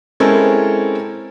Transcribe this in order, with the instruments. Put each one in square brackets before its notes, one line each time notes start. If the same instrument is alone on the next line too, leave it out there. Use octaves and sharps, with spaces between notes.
[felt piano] G#3 C4 C#4 E4 A4 A#4